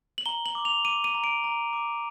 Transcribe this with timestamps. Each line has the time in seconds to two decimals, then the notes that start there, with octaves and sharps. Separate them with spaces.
0.18 F#7
0.26 A#5 G7
0.46 F#7
0.55 D6
0.65 F7
0.85 D6 D#7
1.04 D#7
1.14 A#5
1.24 D7
1.44 A#5
1.73 D6